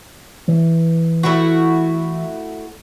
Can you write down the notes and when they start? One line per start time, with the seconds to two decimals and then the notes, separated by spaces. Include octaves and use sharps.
0.48 E3
1.23 A3 E4 F#4